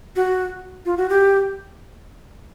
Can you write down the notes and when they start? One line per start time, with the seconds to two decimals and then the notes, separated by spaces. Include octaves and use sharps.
0.16 F#4
0.85 F4
0.97 F#4
1.10 G4